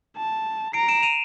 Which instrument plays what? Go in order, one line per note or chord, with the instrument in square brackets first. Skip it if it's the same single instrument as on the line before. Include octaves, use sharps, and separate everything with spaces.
[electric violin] A5
[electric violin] A#5 [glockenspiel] C7 D7
[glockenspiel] D7 E7
D#7 F7